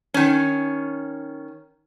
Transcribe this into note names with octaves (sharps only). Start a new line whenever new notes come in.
D#3 C#4